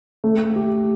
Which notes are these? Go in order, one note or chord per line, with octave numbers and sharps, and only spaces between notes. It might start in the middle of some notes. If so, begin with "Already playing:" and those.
A3
G4